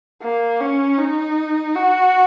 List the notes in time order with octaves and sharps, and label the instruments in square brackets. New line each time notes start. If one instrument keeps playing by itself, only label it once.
[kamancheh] A#3
C#4
D#4
F#4